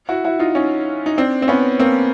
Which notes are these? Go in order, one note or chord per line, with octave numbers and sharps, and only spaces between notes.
E4 F#4
E4 F#4
D#4 F4
C#4 D#4
D#4
C4 D4
C4
B3 C#4
A#3 C4